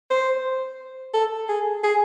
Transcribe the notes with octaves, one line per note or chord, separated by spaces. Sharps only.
C5
A4
G#4
G#4